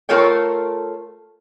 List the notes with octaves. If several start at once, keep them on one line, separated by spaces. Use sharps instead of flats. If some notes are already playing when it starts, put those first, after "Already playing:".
A3 F4 A4 A#4 C#5 G5